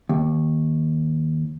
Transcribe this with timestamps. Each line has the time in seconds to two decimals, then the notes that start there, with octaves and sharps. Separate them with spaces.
0.09 D#2